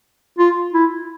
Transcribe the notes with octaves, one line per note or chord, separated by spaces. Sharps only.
F4
E4